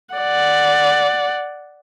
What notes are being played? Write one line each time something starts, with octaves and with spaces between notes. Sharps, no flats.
D5 F#5